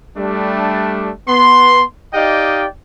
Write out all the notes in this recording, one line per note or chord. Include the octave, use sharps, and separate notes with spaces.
G3 A3 D4
B3 C6
D#4 G4 D5 D#5 F5 G5